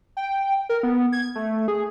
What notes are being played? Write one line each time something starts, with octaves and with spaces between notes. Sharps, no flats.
G5
A#4
B3
G#6
A3
G#4